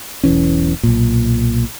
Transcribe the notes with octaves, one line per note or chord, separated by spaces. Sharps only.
E1 B1 E3 C#4
B1 A#2